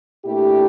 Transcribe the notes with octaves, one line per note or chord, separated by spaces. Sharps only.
A#2 A3 D4 E4 G4